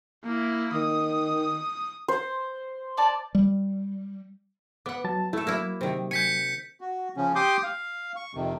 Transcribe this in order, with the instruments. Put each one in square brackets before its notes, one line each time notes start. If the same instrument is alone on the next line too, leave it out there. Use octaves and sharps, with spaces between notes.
[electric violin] A#3 E4
[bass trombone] D#3 [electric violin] D#6
[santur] C5
[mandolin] D5 A5
[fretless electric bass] G3
[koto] B3 F#5 [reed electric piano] B4 D6
[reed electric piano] F#3 A5 A6
[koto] A3 A4 [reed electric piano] E4
[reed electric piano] F#3 [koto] A#3 E4
[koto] C3 D#3
[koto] G#5 [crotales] G6 B6 C#7
[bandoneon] F#4
C#3 F3 C#4
G4 C6 D6 D#6 G6
F5
C#6
F2 C3 D#3